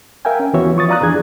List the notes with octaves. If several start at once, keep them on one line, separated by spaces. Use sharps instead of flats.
A#4 E5 F5 G5 G#5
C#4
D#2 E3 B3 F#4 C#5 E5
F3 F4 C#6 D#6 A6
D5 F5 A#5 D#6 F#6
F2 E3 D4 G#4 G#6